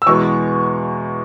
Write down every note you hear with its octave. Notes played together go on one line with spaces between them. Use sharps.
E6
E2 B2 G#3 B3 C#6